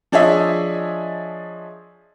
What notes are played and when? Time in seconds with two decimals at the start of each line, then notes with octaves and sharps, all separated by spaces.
0.12 F3 D4 G#4 C#5 D#5 E5